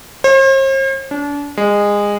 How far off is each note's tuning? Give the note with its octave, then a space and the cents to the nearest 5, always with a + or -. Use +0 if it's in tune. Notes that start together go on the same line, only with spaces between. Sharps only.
C5 +45
D4 -35
G#3 -20